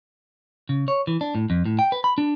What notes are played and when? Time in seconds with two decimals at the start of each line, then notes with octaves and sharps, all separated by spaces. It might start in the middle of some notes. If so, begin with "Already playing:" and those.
0.69 C#3
0.88 C#5
1.07 E3
1.21 D4
1.35 A2
1.50 F2
1.66 A2
1.79 G5
1.92 B4
2.04 B5
2.18 D4